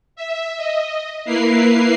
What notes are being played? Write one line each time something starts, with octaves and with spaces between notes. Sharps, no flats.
E5
D#5
A#3 E4 A#4 B4 C7